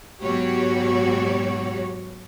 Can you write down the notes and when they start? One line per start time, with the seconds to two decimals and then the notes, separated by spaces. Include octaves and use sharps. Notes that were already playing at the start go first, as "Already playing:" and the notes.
0.21 G#2 B2 F#3 F#4 G4 C#5